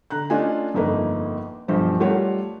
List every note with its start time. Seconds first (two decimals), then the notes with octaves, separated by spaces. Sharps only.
0.10 D3 A#5 F#6
0.30 A3 C#4 D4 F4 D#5 G#5
0.74 G1 F2 A#3 D#4 B4
1.68 B1 G2 F3 C5
2.00 G3 A3 F4 A#4 C#5 F#5